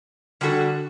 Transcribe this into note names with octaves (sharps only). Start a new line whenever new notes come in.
D3 G3 D4 F#4 A4